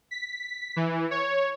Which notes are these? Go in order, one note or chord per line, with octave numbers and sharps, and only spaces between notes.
B6
E3
C#5